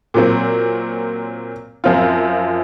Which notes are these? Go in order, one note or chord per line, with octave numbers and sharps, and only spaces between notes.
A#2 F#3 C4
F#2 F3 C4 F4